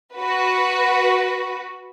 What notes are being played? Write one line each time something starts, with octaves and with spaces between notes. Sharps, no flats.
F#4 B4